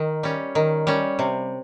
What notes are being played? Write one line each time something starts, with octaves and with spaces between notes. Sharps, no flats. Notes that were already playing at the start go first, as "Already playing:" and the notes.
Already playing: D#3
G3 C#4
D#3
G3 C#4
C3